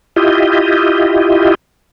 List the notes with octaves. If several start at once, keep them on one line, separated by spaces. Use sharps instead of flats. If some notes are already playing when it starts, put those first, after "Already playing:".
E4 F4 G4 D#5